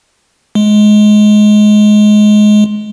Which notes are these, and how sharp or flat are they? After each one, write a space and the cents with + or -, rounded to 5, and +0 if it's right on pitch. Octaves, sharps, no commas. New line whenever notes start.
G#3 +20